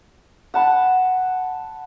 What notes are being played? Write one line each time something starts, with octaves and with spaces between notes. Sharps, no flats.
F#5 A5 B5